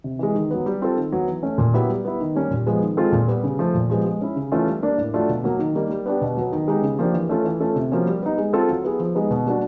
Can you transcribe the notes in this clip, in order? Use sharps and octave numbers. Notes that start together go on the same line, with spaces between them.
C3
E3 G#3
D#3
F#3 B3
G3
C4 F4 A4
D#3
F#3 B3
E3
A3 C#4
A#2
F#3 B3 E4 G4
G3
B3 E4
D#3
G3 A#3 C#4
A#2
F3 G#3 B3
D#3
G#3 C4 F4 A4
A#2
G3 B3
C#3
F3 A3
A#2
F3 G#3 B3
G#3
C#4 E4
C#3
E3 A3 C#4 F4
G3
A#3 D4
A2
F#3 A3 D4 F4
B2
F#3 A#3
D#3
G3 A#3 D#4
G3
B3 D4 G4
B2
F#3 B3
D#3
G#3 B3 D#4 G4
C#3
F3 A#3 D4 G4
E3
A3 C#4 F4 A4
E3
A3 C#4 F4 A4
C3
F3 A#3 C#4 F#4
G3
B3 D#4
G#3
C4 F4 A4
F#3
B3 E4 G#4
F3
G#3 B3 D#4
B2
G3 A#3 D4 F#4